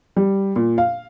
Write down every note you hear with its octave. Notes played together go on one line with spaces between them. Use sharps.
G3
A#2
F5